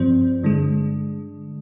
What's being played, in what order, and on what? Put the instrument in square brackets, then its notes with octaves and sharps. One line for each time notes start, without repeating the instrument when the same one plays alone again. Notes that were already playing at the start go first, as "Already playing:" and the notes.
Already playing: [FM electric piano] G2 F3 C4
G2 D3 G#3